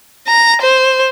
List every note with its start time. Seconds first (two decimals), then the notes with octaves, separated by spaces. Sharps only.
0.28 A#5
0.62 C5